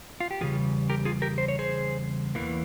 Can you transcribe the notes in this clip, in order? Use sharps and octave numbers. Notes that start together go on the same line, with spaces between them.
F4
G4
E2 C#3 G3 F4 G#4
G4 A#4
F4 G#4
G4 A#4
C5
C#5
G#4 C5
E2 E3 A#3